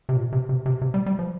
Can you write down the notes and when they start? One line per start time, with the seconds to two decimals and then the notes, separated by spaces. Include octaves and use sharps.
0.09 C3
0.16 A#2
0.32 C3
0.49 C3
0.66 C3
0.82 C3
0.94 G3
1.06 G3
1.19 F3